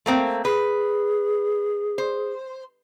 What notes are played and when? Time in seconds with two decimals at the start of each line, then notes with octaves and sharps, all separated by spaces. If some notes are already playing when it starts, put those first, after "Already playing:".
0.06 A3 A#3 C4
0.45 G#4 B4
1.98 C5